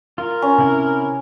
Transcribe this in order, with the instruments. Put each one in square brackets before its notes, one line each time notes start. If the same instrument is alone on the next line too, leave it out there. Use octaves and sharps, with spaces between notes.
[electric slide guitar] F4 [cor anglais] A#4
[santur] C#4
[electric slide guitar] C3 E4